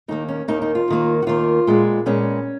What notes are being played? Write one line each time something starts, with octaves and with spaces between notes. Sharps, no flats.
D#2 D#3 A#3 D#4
C#4
D#2 D#3 A#3 D#4
D#4
F4
D#2 D#3 A#3
F#4
D#2 D#3 A#3 F4
A#2 G#3 B3
A#2 G#3 B3 C#4